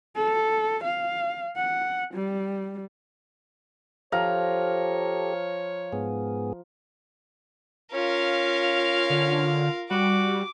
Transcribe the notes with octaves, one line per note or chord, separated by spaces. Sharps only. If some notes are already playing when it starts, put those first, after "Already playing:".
A4
F5
F#5
G3
F3 G4 A4 C#5 F5 A#5
G#2 B3 G#4
C#4 F4 A#4 F5
D3
G3 F#4 D6